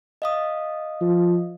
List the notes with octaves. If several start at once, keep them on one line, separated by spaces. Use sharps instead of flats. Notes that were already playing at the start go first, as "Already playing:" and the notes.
D#5 F5 D#6
F3